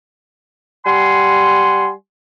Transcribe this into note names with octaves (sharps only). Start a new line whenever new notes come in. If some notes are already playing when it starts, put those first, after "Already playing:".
G3 F#5 G#5 C6